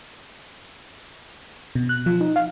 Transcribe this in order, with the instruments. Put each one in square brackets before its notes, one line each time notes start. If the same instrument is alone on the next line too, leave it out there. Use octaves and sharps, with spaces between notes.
[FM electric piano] B2
F#6
F3
D#4
F5